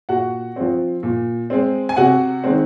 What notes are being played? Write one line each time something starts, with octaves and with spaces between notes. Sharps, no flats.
A#2 F#4 F#5
F3 C4
A#2
G#3 C4
G#5
C3 F#4 F#5
D#3 G#3 C4